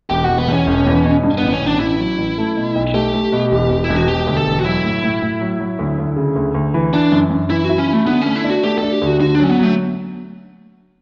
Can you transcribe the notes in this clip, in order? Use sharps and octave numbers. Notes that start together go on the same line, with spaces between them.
E1 G4
E1 F#4
B3
E2 C#4
E1
E2
B2
G2
A1 B3
C#4
A1
D4
A1 E4
F#3
A1
A3
B2
B1
A3 G4
A3
B2
E1
E1
E4
E1
F#4
E1 G4
D2
A4
E1
F#4
F#3 E4
A2
A2
A2
F#3
F#3
D2
D2
C#3
D2
D2
E3
E3 D4
F#2
F#2
E3 E4
E4 F#4
C#4
E4
A3
D3 B3
A3 C#4
E4
D4
F#4
A3 G4
D4 A4
G4
D2 F#4
D3 F#4
D4
F#3 C#4
B3
F#3 A3